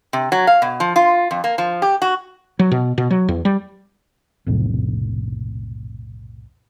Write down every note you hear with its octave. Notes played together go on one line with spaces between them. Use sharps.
C3
F#3
F5
B2
F3
F4
F2
A#3
F3
G4
F#4
F#3
B2
B2
F#3
E2
G3
B1 F2 A2 C3